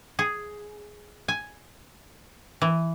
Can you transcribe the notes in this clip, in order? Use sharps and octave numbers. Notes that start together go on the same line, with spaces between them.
G#4
G#5
E3